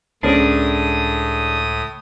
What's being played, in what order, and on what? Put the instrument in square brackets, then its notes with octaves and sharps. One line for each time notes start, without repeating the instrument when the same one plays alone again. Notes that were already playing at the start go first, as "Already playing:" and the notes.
[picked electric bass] C#2 [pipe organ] A2 D#6 [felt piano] C#4 C5 [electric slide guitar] D4 G#4 A#4